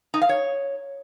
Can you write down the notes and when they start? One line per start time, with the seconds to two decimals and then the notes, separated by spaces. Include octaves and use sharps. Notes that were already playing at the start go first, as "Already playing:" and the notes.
0.14 D#4
0.21 F5
0.29 C#5